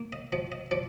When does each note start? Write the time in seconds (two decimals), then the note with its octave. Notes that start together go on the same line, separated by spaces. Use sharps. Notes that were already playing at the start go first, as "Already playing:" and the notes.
Already playing: A#3
0.13 D#5
0.32 F3 D#5
0.52 D#5
0.71 F3 D5